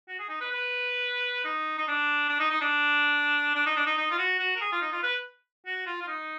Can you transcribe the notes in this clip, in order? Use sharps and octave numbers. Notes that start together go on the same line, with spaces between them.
F#4
G#4
D#4
B4
B4
D#4
D#4
D4
D4
D#4
D#4
D4
D4
D#4
D4
D#4
D#4
F4
F#4
F#4
A#4
G#4
F4
D#4
F4
B4
F#4
F4
F4
D#4